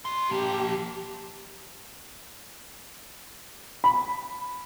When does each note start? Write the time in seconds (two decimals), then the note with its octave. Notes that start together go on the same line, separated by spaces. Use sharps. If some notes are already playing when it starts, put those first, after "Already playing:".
0.05 F#4 C6
0.30 F3 A#3 G4
3.84 B5